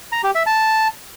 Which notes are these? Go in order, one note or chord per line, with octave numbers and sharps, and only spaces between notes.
A#5
G4
E5
A5